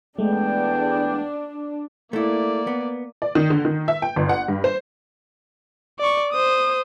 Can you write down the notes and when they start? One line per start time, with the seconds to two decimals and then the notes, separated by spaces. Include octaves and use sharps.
0.18 E2 G#3 A3 B3 D4 G5
2.13 A3 A#3 E4 D5
2.67 B3
3.22 D5
3.35 D#3
3.50 D3
3.65 D#3
3.88 E5
4.02 G5
4.16 G1
4.29 F#5
4.48 G2
4.64 C5
5.99 D5 C#6
6.33 C5 D#6